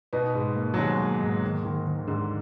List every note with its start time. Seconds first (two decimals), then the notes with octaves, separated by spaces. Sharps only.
0.13 B2 B3 D#4
0.35 G#2
0.56 A#3
0.74 F#3
0.77 G#2 D#3 G#3
0.99 A#3
1.21 G#2
1.43 D#3
1.65 D#3
1.87 D#3
2.08 G#2 D3